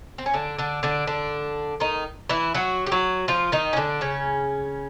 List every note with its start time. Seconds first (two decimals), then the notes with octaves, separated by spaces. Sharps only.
0.18 C4
0.26 C#4
0.34 D3 D4
0.58 D3 D4
0.83 D3 D4
1.07 D3 D4
1.80 D#3 D#4
2.29 E3 E4
2.55 F#3 F#4
2.86 G4
2.92 F#3 F#4
3.28 F3 F4
3.52 D#3 D#4
3.73 C#4
3.77 D3 D4
4.01 C#3 C#4